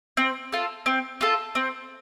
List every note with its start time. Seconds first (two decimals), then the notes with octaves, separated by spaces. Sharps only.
0.17 C4
0.52 F4 A4
0.86 C4
1.21 F4 A4
1.55 C4